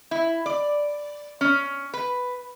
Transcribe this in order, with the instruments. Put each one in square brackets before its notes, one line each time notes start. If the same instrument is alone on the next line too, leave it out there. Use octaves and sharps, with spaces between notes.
[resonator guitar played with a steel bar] E4
D5
C#4
B4